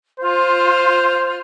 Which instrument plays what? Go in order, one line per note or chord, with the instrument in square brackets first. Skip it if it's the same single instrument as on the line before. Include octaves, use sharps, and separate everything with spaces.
[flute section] F4 [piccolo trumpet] C5